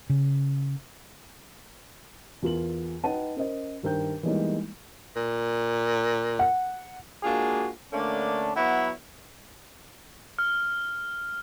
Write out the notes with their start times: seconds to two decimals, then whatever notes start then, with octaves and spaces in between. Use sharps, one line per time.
0.10 C#3
2.42 E2 F4 A#4 F#7
3.04 D#4 B4 F#5 G5 A5 D#7
3.36 C#4 A#4 C5 D#5
3.83 G2 D#3 A#4 C5 G5 G6
4.23 E3 G3 G#3 A#3 B3 D#4
5.16 A#2
6.39 F#5
7.23 G#3 A#3 D4 F4 F#4 G#4
7.92 D3 A3 A#3 C#4 D4
8.56 F#3 B3 E4 C#5 F#5 B5
10.39 F6